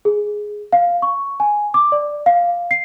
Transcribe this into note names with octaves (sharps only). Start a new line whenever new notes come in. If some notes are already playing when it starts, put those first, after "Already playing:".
G#4
F5
C#6
G#5
D6
D5
F5
C7